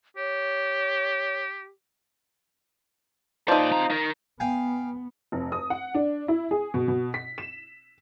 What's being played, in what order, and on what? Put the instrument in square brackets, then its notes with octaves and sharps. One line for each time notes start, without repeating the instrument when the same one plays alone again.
[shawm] G4 [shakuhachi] C#5
[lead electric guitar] A#2 D5 [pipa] F3 D#4
[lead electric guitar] C4 A#5
D#4 A#4
[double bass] B3 [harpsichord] F5 G5 G#5
[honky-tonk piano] F1
D#6
F#5
D4
E4
G#4
B2
B2
B6
E7